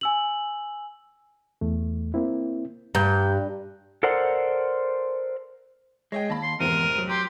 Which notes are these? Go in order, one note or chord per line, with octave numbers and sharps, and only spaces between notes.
G#5 E6 F#7
E2 A3
A#3 C4 E4
G2 A#5 G6
A4 A#4 C5 D5 F#5
G#3 C#5 D#5 G5
D#2 A5 B5
C6
F1 E2 G#2 C4 A#4 D#7
F#3
G4 A#5 C6